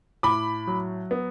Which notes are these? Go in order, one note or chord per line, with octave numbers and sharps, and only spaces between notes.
A2 B5 D6
F#3
B3